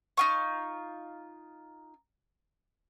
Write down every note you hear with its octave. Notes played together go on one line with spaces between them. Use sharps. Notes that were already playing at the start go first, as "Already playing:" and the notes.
D#4 F4 C#6